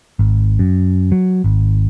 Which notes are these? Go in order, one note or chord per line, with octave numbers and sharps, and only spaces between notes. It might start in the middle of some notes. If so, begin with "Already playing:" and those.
G#1
F#2
F#3
G#1